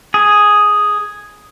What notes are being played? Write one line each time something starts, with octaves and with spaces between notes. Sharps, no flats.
G#4